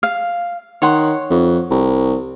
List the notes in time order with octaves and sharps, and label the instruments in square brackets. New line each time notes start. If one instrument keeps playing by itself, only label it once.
[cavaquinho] F5
[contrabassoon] D#3 [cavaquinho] C#5 F#5 C6
[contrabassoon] F2
C2